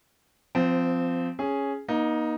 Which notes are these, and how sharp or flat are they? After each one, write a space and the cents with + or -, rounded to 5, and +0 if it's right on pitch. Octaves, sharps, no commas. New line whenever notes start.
F3 +0 C4 -20
C#4 +0 G#4 +0
A#3 +35 D#4 +0